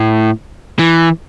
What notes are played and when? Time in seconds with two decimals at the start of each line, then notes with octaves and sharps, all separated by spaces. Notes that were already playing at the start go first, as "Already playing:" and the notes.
Already playing: A2
0.79 E3